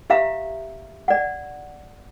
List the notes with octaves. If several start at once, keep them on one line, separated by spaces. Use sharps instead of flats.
G4 E5 F5 A#5
D5 F#5